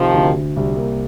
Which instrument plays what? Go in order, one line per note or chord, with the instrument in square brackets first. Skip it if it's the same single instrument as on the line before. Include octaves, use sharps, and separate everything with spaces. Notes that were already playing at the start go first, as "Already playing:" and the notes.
Already playing: [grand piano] C3 [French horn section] D#3 F3
[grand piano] D2
D2
C2
A#3